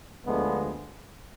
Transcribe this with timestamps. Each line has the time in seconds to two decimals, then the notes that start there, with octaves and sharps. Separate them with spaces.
0.24 D2 D3 F3 G#3 B3